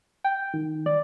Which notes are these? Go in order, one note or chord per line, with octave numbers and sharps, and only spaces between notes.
G5
D#3
D5